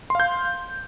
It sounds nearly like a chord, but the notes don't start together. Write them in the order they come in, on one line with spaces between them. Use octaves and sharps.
C6 F5 G6